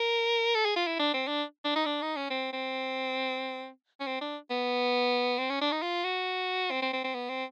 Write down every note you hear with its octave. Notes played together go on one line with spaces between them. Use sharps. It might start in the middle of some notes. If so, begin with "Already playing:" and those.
Already playing: A#4
A4
G#4
F4
E4
D4
C4
D4
D4
D#4
D4
D#4
C#4
C4
C4
C#4
C4
D4
B3
C4
C#4
D4
D#4
F4
F#4
C4
C4
C4
C4
B3
C4